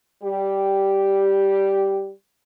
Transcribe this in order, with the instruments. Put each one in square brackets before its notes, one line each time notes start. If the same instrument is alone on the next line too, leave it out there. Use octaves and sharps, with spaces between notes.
[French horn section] G3 G4